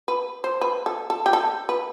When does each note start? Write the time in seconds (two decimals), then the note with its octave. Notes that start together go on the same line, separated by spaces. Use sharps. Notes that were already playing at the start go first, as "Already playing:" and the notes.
0.08 B4
0.44 C5
0.61 B4
0.86 A4
1.10 A4
1.26 G4
1.33 A4
1.69 B4